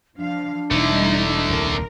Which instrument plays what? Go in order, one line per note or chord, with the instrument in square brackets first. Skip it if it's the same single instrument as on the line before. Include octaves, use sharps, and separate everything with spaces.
[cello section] F3 F5 [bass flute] D4
[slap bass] E1 [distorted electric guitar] D3 A3 [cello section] G3 D#4 E4
[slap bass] D#1 C2 C3 [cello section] A#4